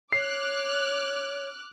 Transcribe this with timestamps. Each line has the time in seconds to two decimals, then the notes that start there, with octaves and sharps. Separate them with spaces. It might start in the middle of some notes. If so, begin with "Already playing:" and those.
0.12 C#5 D6 F6 F#6 C7